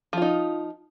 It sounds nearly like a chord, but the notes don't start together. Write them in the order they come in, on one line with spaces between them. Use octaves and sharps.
F3 F4 D#4